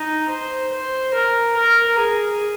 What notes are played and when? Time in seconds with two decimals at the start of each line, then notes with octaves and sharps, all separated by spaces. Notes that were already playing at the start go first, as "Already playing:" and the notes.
Already playing: D#4
0.29 C5
0.73 C5
1.14 A#4
1.56 A#4
1.99 G#4